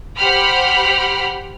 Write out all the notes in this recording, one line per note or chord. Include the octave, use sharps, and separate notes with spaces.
G4 C5 F#5 G5 B5 F6